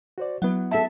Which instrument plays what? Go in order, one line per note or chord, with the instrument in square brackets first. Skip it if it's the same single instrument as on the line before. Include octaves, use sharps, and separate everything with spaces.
[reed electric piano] F#4 C5 D5
[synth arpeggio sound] F#3 [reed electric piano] B3 E4 F#5
[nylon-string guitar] F#4 A4 [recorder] E5 [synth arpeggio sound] A5